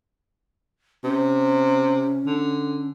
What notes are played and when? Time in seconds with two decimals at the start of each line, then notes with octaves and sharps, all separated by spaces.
1.04 C3 C#4
2.26 D3